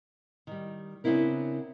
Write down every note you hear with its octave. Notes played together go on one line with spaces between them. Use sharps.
D#3 G3
C#3 B3 C4 D4 E4 A#4